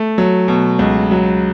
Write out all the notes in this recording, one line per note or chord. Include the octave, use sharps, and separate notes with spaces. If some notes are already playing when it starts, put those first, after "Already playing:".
Already playing: A3
F#3
B2
C#2
F#3